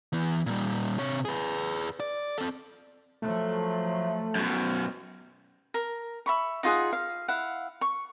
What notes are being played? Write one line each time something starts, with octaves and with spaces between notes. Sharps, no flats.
E3 B3
A#2 G3
C3 C#5
G#4 B4
D5
C4 A4
F3 F#3 A3
F#2 B2
A#4
E5 B5 C#6
D#4 F4 G#4 F#5
F5
E4 F5 F#5
C#6